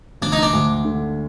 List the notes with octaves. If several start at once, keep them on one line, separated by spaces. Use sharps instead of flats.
D2 D4
D#4
D4
D2
D3